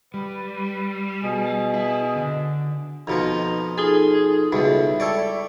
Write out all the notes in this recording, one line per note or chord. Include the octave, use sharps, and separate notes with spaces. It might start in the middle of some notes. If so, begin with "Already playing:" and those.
G3 B4
B2 G#4
E4
D3
F2 B2 F3 D#4
D#4 F4 G#4 A4
C#2 B2 G3 D#4 E4 A4
A4 C#5 D5 G5 D6